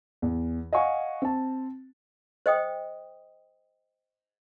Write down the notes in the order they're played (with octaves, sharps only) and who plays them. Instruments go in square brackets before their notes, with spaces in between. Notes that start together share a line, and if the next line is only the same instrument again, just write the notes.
[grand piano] E2
D#5 F5 F#5 G#5 C#6
C4 A5
[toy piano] C5 D#5 G5 D#6